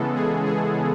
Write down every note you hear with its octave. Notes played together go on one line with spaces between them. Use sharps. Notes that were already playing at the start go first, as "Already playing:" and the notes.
Already playing: C#3 E3 G#3 B3 A4
G#4
G#4